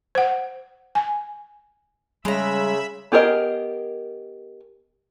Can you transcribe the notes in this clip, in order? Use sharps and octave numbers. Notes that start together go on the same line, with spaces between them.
C5 F#5
G#5
C#3 G3 G#3 E5 A#5 B5 E6
B3 G4 G#4 A#4 D#5